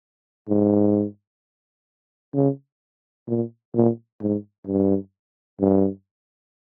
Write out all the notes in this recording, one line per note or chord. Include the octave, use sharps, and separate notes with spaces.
G#2
C#3
A#2
A#2
G#2
G2
G2